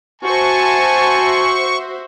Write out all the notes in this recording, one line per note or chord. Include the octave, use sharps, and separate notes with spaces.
F#4 C5 E5 G#5 A5 C#6